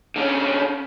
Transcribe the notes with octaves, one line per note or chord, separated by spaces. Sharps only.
D3 C#4